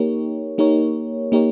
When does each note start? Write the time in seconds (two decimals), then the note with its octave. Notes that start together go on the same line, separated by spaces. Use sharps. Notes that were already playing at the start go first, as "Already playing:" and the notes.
Already playing: A#3 D#4 G4 A#4 C#5
0.58 A#3 D#4 G4 A#4 C#5
1.32 A#3 D#4 G4 A#4 C#5